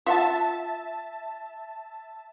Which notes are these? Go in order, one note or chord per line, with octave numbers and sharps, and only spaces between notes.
F4 E5 F#5 A5